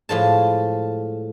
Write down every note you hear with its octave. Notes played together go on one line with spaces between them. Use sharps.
A2 F3 G#3 A5